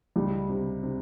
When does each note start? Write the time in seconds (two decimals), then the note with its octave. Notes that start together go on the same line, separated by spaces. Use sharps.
0.16 C#2 G3
0.49 C3
0.83 C3